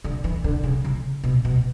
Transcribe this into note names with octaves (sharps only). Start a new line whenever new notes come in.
D3
E3
D3
C#3
C#3
B2
B2